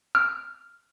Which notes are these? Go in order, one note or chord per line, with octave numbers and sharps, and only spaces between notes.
F6